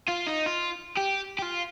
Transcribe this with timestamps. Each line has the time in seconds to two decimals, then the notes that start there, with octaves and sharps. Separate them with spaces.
0.08 F4
0.27 D#4
0.46 F4
0.97 G4
1.39 G4
1.42 F4